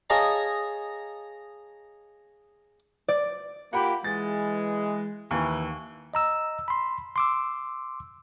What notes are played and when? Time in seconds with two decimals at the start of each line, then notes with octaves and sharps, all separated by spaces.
0.10 G#4 C#5 D#5 F5 A5 A#5
3.08 D5
3.73 A#3 F4 G4 F#5 B5
4.04 E3 G#3 A6
5.31 D#2 E3 C#6
6.14 D#5 A#5 E6
6.68 B5 C6
7.16 C6 D6 E6